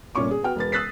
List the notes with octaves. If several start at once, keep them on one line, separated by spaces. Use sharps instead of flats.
G1 A#2 C#4 C#6 D6
G#4
B3 F#4 G5 F6
E1 B4 A6
D#6 E6 F#6 A6 B6 C7